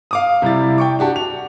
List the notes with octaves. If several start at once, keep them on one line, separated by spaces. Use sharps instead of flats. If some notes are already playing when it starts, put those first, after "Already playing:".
F5 D6 D#6
C3 G3 E4 A6
G5 C#6 D6
D4 F#4 G4 A5
F7